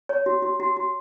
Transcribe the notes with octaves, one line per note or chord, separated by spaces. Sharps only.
C#5
F#4
F#4
F#4
F#4